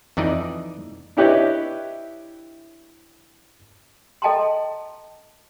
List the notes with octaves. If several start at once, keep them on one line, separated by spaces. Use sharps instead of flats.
F2 E3 D#4 D5 D#5
D4 E4 G4 B4 C#5 D#5
A4 D#5 G5 A5 A#5 C6